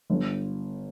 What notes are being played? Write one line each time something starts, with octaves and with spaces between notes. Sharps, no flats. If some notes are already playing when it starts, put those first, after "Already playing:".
G1